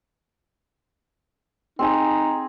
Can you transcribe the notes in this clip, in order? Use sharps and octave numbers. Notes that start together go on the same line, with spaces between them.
C4 D#4 G#4 G#5